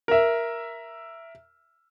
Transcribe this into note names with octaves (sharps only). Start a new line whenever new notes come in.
A#4 E5